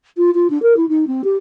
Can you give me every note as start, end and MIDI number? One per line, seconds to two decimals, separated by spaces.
0.17 0.30 65
0.34 0.47 65
0.50 0.61 62
0.62 0.76 70
0.76 0.88 64
0.88 1.05 63
1.07 1.21 60
1.24 1.37 67